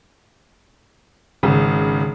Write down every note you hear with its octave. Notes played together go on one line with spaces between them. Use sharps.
G#1 C#3